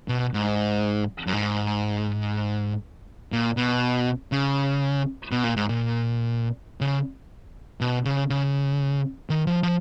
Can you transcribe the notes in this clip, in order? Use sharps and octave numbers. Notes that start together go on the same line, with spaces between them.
B2
G#2
F#2
G#2
A#2
B2
C#3
B2
A#2
G#2
A#2
C#3
B2
C#3
C#3
D#3
F3
F3